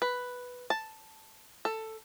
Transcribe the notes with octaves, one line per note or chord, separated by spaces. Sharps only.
B4
A5
A4